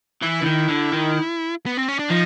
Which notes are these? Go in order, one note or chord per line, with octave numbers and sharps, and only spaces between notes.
E3 E4
D3
D#3
D3
D#3
B3
C4
C#4
D4
F3 D#4